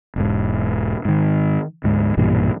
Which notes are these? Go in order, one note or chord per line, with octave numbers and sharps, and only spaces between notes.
E1 G#2
G#2 D#3
D2 G#2
B1 G2 A#2 E3